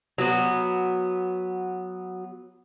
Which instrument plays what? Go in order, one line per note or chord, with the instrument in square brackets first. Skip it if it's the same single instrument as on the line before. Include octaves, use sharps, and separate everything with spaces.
[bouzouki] F#3 B3